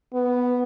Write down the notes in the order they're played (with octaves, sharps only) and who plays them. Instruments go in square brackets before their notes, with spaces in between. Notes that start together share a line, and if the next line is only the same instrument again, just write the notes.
[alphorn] B3